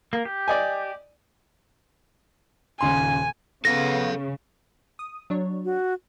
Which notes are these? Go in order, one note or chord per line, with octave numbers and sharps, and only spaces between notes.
A#3
G4
D5 D#5 G#5
D#1 C#3 G#5 C6
C#3 B3 A4 F5 A#6
D#6
F#3 D4 C#5
F#4